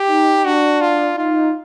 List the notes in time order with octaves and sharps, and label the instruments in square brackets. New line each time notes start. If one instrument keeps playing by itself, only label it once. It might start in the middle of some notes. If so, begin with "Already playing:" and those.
Already playing: [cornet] G4
[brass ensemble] D#4
[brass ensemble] D4 [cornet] F#4
[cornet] F4
[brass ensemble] D#4 [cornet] F4